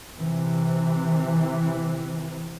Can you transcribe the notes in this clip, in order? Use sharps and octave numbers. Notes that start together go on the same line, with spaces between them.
C3 E3